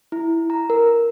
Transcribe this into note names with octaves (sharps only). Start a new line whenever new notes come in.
E4
A#5
A#4